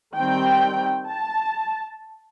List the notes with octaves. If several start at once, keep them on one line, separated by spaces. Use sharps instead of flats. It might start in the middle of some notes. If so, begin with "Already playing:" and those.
D#3 G3 C4 G5
A5